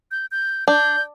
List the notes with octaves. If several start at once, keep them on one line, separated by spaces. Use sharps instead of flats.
G6
G6
D4 G6